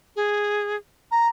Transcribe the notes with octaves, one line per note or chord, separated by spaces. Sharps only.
G#4
A#5